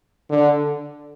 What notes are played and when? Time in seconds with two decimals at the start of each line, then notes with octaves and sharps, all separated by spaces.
0.30 D3